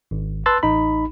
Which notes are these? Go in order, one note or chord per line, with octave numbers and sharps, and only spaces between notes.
G#1
B4 A5 C6 E6 F#6 A6
A1 D#4 B5